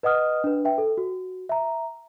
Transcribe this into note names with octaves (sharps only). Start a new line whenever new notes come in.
B4 D#5 F#5 D#6 F6
D4 B4
B4 E5 G5
A4
F#4
E5 A#5